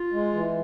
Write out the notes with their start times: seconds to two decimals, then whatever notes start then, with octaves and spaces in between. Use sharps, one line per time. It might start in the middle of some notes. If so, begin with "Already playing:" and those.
Already playing: F4
0.13 G#3
0.34 E3